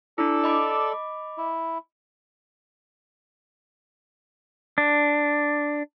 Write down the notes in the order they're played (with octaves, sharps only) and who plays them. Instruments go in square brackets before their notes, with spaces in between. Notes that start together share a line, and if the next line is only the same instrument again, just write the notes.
[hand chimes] D4 E4 [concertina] A4 D5 E6
[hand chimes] D#5 B5 D6
[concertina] E4
[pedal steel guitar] D4